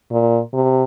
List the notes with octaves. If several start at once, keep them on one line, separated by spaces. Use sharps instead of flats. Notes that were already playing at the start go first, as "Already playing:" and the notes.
A#2
C3